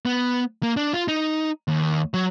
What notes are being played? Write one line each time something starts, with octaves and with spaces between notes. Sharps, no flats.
B3
A#3
D4
F4
D#4
D#2
F#3